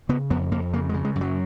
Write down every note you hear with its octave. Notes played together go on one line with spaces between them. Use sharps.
C#3 B3
F2 B3
F2 A#3
C#3 A#3
G#3
C#3
G#3
F#2
F#3